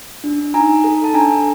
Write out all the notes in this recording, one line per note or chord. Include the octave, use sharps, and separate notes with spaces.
D4
D#4 G#5 A#5
A4
A5
D4 G#5 A#5